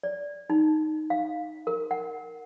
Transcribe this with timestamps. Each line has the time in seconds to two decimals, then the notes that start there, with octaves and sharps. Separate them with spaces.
0.03 D5
0.50 D#4
1.10 F5
1.67 A#4
1.91 F#5